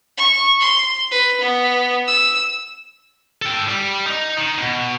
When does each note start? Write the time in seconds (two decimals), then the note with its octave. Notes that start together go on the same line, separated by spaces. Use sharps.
0.17 C#6
0.61 C6
1.11 B4
1.40 B3
2.07 E6
3.42 A4 G5
3.68 G3
4.07 D#4
4.37 D#3
4.58 B2